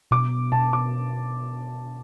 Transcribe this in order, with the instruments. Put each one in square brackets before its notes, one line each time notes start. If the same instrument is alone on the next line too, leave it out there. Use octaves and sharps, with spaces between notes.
[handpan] B2 [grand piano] D6
[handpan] B2 [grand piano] A5
[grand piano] D6